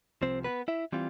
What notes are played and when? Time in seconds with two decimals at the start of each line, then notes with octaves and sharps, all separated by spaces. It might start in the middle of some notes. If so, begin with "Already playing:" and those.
0.22 C2 C3 F3 C4 C5
0.44 B3 B4
0.68 E4 E5
0.92 E3 G3 C4 F4